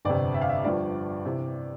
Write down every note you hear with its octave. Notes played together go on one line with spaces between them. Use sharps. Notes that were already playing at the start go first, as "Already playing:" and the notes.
G1 F2 C3 D5
E5
F5
E5
G1 G2 F3 D5
C3 E3